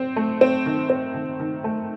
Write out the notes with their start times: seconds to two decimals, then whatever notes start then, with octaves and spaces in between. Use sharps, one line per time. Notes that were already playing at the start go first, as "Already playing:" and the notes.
Already playing: C4
0.16 A3
0.41 C4
0.66 D#3
0.90 C4
1.14 D#3
1.40 D#3
1.64 A3